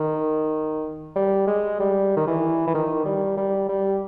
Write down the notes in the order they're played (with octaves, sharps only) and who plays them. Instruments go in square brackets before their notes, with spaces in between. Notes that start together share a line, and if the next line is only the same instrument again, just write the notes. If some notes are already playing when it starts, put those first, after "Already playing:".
Already playing: [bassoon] D#3
G3
G#3
G3
D#3
E3
E3
D#3
G3
G3
G3